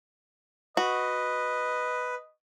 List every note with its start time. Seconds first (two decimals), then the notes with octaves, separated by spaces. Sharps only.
0.77 F#4 B4 D#5